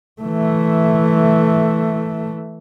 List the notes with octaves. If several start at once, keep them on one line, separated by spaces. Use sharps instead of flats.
E3 A3